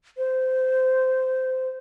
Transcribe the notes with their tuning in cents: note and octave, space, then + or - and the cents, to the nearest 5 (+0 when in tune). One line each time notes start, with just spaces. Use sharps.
C5 -15